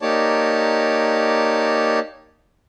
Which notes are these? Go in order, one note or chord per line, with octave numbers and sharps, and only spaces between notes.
A#3 D#4 G4 C#5 D5 A5